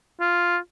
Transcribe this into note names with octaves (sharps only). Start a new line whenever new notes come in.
F4